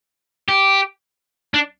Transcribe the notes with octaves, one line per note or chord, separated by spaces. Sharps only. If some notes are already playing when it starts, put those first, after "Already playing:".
G4
D4